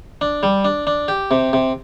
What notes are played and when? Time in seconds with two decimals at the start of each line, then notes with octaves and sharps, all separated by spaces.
0.21 D4
0.43 G3
0.65 D4
0.87 D4
1.08 G4
1.31 C3
1.53 C3